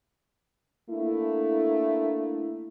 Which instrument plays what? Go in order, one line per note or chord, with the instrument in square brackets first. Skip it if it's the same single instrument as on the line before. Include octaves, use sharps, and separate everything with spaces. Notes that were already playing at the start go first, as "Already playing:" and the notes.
[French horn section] A3 A#3 D4 E4